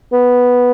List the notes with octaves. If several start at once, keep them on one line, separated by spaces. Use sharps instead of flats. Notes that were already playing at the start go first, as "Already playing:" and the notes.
B3